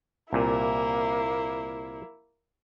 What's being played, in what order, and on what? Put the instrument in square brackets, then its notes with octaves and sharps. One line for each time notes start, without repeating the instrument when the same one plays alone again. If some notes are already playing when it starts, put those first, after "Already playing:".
[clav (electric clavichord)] C2 A#2 [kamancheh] A#3 E4